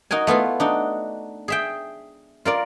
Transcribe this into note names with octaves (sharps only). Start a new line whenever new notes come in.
D#4 F#4 A#4 G#5
A3 B3 E4 F4
D4 D#4 F#4
G#4 E5 G5
F4 A#4 D5